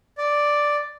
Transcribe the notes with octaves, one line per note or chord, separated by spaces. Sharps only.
D5